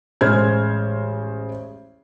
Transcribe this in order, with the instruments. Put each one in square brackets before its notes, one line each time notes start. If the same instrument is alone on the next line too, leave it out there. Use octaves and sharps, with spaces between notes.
[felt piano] A1 G#3 C5 F6 G#6